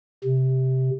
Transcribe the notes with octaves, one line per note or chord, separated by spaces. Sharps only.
C3